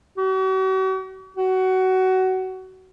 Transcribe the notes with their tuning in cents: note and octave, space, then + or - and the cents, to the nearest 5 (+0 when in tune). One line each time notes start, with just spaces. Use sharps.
F#4 +45
F#4 +20